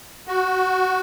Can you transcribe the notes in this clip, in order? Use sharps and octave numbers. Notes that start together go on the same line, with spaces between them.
F#4